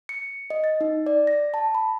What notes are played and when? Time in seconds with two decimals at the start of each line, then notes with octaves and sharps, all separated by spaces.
0.09 C#7
0.50 D#5
0.64 A6
0.81 D#4
1.06 D5
1.27 A#6
1.54 A5
1.74 B5